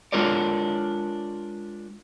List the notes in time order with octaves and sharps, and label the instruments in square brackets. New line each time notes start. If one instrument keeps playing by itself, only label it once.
[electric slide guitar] G#3 D4 F4 A#4 C#5 D5